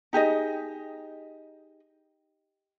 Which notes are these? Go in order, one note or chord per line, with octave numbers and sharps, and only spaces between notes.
D#4 G4 G#4 D#5